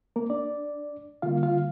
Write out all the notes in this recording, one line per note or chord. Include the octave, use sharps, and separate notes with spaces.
A#3 A#4
D4 D5
D3 G3 A#3 F4 F5
F4 F5